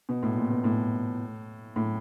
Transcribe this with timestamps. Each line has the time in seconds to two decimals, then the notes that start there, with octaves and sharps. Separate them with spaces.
0.09 B2
0.23 A2
0.37 A#2
0.51 B2
0.64 A2
1.76 A2